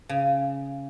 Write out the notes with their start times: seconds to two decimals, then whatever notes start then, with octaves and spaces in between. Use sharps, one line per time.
0.09 C#3